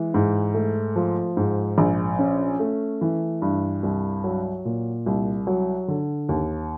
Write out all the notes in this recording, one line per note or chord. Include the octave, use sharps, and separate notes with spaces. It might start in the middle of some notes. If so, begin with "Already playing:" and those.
Already playing: E3 G#3
G#2
A3
F3
G#2
A#1
C#4
A3
E3
G2
C2
F#3
A#2
C2
F#3
D3
D#2